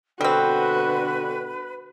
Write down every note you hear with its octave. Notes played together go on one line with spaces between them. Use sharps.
B2 D3 G3 C4 F#4 B4